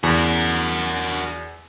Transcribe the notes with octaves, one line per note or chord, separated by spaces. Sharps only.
E2 F#4 A#4